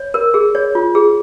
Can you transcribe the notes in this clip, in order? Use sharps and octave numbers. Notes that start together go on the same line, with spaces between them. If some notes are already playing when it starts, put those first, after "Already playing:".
Already playing: C#5
A#4
G#4
C#5
F4
G#4